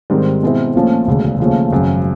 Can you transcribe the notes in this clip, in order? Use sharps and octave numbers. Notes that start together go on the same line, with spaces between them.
G#2 D#3 G3 C4
B2 G#3 C4 E4
A#1 A#2 F3 A3 C#4
E1 D2 C#3
D#2 C#3 F3 A3 C#4
G#1 F#2 C#3